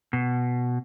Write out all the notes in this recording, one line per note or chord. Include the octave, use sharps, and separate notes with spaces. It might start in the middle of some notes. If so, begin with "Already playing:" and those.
B2